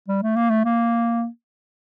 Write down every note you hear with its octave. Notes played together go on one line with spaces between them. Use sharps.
G3
A3
A#3
A3
A#3